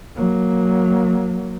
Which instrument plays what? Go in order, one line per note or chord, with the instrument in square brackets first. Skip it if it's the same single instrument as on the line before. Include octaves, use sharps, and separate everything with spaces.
[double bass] F#3 A#3